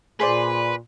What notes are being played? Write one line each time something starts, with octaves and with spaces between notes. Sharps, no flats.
A#2 G#4 B4 C5 D5